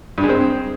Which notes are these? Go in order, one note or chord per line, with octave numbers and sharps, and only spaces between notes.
G2
G#3
C4